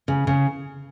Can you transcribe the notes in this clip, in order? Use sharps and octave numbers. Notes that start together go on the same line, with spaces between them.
C#3
C#3